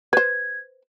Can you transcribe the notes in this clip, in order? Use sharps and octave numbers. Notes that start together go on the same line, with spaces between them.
B4 C5 G#6